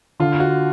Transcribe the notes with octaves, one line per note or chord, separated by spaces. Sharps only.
D3 F4
F#4